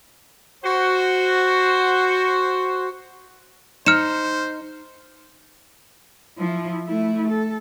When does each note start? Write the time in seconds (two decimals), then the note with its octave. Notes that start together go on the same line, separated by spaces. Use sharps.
0.64 F#4 C5
3.86 D#4 C5 F6 C#7 E7
6.38 F3 E4
6.87 A3 E4
7.29 A4